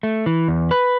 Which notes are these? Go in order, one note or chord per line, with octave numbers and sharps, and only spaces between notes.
A3
E3
E2
B4